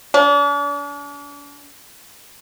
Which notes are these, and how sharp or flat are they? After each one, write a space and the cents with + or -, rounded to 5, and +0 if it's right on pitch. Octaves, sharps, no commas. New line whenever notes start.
D4 -45